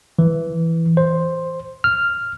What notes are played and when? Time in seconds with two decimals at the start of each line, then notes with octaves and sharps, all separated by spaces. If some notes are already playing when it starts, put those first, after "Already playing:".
0.19 E3
0.97 C5
1.84 F6